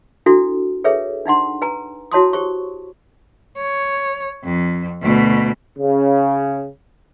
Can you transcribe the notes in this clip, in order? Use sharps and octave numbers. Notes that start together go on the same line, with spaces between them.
D4 E4 F#4 A4
G#4 A4 B4 C#5 E5
D4 D#4 F#5 C6
B4 G#5 A#5
E4 F#4 C#5 A5 C6 D#6
G4 C5 C#6
C#5
F2
D2 B2
C#3